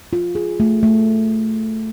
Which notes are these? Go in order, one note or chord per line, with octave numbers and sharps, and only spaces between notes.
F4
G#4
A3
A3